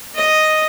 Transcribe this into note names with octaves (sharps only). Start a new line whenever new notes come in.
D#5